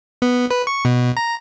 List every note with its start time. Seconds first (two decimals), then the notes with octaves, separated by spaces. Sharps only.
0.22 B3
0.51 B4
0.67 C#6
0.85 B2
1.17 A#5